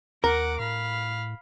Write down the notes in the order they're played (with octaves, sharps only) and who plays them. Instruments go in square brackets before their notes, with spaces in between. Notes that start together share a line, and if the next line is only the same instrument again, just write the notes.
[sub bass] D#2 [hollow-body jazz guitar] A#4 [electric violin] F#5 D6
[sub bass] A2 [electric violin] F5 B5